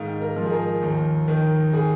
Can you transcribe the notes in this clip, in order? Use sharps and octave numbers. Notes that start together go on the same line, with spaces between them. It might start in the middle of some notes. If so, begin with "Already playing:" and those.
Already playing: G#2 D#3 F5
A#4
F3
G#4
A#4
D#2
D#3
G#4